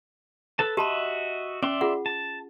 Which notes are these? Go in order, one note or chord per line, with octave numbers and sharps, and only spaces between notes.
A4 B4 A5
F#4 G4 D#5 E5 A5 B5
C#4 D5 E5 C6
F4 G#4 F#5
A5